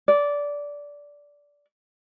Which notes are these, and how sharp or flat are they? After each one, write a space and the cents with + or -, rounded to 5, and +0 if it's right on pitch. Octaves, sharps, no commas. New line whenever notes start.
D5 -15